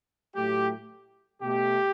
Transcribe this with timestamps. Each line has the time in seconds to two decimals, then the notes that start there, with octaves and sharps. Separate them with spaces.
0.36 A2 F#3 A3 G4
1.42 B2 A3 G4